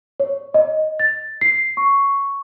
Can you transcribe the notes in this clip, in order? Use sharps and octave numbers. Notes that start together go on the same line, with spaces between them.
C#5
D#5
A6
C7
C#6